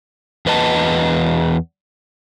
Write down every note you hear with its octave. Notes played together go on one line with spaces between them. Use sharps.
E2 B4 D#5 A5